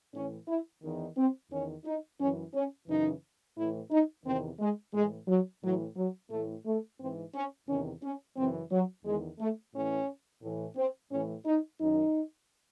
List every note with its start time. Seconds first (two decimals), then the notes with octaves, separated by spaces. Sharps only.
0.14 A2 E3 C#4
0.48 E4
0.83 E2 D#3
1.17 C4
1.50 E2 D#3 C#4
1.85 D#4
2.19 F#2 E3 C#4
2.54 C#4
2.88 F#2 C#3 E3 D#4
3.57 A2 E3 E4
3.91 D#4
4.26 E2 C3 D#3 C4
4.60 G#3
4.94 A2 E3 G#3
5.28 F#3
5.63 A2 E3 F#3
5.96 F#3
6.31 A2 E3 A3
6.66 A3
6.99 G#2 E3 C4
7.34 C#4
7.68 E2 C3 D#3 C#4
8.03 C#4
8.37 F#2 C#3 E3 C4
8.71 F#3
9.05 E2 D#3 G#3
9.39 A3
9.74 A2 E3 C#4
10.42 A2 E3
10.77 C4
11.11 A2 E3 C#4
11.46 D#4
11.80 F#2 D#3 D#4